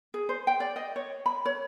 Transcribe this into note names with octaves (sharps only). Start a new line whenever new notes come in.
G#4
C5
G5
D5
D#5
C#5
B5
C#5